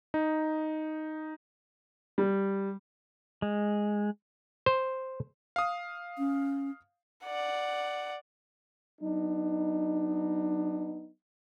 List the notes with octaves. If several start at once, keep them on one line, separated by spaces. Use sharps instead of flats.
D#4
G3
G#3
C5
F5 D#6
C#4
D5 F#5
F#3 B3 D4 D#4